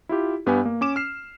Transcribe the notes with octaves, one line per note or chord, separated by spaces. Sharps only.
E4 F4 G4
G2 B3 G4 B4 G#5
A#3
C#4 D6 E7
F6 C7